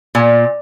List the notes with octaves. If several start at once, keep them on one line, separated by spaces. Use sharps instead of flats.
A#2